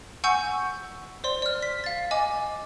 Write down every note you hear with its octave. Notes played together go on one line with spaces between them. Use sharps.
F#5 G#5 C#6 E6 G6
C5 D5 C6
D5 F6
B6
F5 A6
D#5 G#5 D6